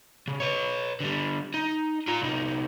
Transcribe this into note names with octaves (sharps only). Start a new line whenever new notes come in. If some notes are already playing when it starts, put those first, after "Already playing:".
C#3
B4 C#5
D3 G3
D#4
F4 A#5
C2 D#4